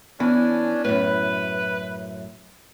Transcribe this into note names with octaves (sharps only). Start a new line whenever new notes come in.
E3 B3 C#4 D4
F#2 A2 B4